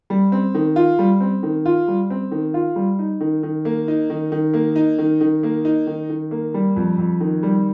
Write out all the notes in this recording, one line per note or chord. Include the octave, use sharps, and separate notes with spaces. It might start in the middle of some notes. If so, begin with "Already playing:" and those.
G3
C4
D#3
F4
G3
C4
D#3
F4
G3
C4
D#3
F4
G3
D#4
D#3
D#3
A#3
D#4
D#3
D#3
A#3
D#4
D#3
D#3
A#3
D#4
D#3
D#3
A#3
G3
F2
F2
D#3
G3